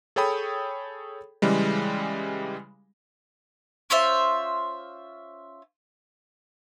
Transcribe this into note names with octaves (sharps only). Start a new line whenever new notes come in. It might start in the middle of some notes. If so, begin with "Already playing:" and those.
G#4 A4 C#5 G5 B5 D#6
C#3 E3 G3 G#3
C#4 F4 C5 E5